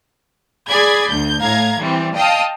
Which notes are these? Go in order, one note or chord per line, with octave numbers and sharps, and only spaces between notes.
G#4 D5 B5 G#6
D2 G6
A2 F5 A#5 G#6
E3 G3 C4
D#5 F5 G5 A5 D#6